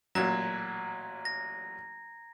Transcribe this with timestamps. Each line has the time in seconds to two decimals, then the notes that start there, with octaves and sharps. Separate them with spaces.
0.15 A1 A#2 F#3 A#5 G#6
1.25 A#6